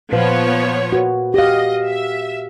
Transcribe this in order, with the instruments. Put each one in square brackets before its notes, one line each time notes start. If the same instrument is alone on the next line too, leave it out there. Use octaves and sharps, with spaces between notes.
[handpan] A#2 B4 F5 [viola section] F3 B3 C#5
[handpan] F#4 A#4 B4
[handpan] G4 F5 [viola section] D#5
[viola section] E5